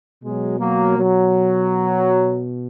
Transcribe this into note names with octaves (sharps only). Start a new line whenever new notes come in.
B2 F#3 G#3
F#3 A#3
F#3